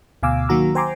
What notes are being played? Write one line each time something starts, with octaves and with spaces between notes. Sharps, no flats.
D2 B2 F5 G#5 D6 E6
D#3 F#3 A#3 F#4 A#5 E6
C5 G5 G#5 A#5 C6 D6